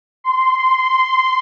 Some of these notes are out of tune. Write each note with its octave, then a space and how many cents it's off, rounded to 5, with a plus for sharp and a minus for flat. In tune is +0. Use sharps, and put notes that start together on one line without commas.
C6 -10